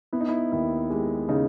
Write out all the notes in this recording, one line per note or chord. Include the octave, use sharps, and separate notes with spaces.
B3 E4
D#4
E4
D#2 E4
G#3 G4
C#3 D#4